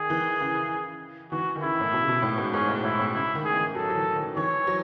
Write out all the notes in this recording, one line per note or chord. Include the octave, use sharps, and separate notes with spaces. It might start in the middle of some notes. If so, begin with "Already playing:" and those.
Already playing: D#3 G#4
E3
C#3
E3 F#4
D#3
C#3 E4
A2
B2
C#3
B2
A2
G#2
G#2 C#4
A2
A2 E4
A2
C#3 E4
D#3
G#4
E3
F#3 A4
F#3
E3
D#3
E3 C#5
F#3